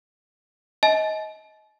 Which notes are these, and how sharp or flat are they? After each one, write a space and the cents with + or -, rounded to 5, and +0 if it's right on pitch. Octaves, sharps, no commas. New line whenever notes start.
D#5 +25 A5 -45